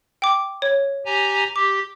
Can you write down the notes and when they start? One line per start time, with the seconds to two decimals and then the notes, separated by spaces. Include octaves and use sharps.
0.22 G5 D6
0.62 C#5
1.05 G4 G#5 A#5
1.56 G4 D6